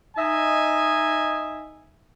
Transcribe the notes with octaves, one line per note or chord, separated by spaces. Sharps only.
D#4 D#5 E5 G#5